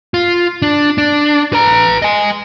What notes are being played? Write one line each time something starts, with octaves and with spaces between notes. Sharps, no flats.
F4
D4
D4
B4 A#5
D#5 G#5